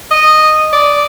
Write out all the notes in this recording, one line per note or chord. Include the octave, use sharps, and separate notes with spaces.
D#5
D5